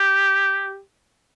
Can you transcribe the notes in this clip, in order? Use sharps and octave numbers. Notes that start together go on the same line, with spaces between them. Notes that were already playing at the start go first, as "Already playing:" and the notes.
Already playing: G4